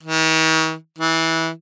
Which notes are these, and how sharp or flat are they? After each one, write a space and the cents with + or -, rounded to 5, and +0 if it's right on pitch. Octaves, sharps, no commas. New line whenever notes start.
D#3 +45
E3 -20